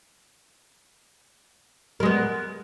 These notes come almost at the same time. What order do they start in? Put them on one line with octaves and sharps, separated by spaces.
A#4 G#3 B3